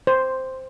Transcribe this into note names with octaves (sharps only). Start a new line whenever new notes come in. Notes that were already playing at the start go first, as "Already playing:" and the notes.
C5